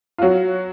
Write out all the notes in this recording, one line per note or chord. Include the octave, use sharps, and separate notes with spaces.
F4
F#3 F#4